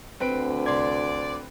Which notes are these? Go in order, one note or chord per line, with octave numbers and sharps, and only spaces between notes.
D2 C4 B4 D7
C2 D5 C6 G#6